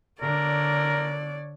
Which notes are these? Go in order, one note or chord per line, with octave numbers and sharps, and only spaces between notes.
D3 A#4 C#5 D5